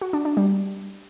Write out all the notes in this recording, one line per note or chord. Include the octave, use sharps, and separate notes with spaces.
F#4
D4
D4
G3